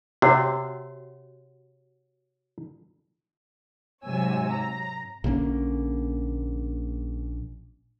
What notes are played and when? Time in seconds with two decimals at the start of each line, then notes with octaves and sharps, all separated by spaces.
0.22 C3 F#4 C#5 F#5
4.06 G#2 C3 F#3 C#5 G#5 E6
4.53 A#5
5.24 A#1 D3 A#3 C#4